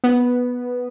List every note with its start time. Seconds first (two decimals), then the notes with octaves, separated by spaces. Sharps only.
0.04 B3